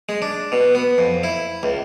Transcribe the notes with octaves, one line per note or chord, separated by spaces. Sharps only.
G#3
D4
B2
B3
F2
E4
C#2